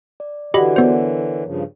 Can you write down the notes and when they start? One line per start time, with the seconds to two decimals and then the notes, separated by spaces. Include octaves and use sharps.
0.20 D5
0.54 D3 E3 F#4 G4 D5 D#5 F#5 B5
0.76 B3 A#4 C5 C#5
1.45 G2 C#3 F3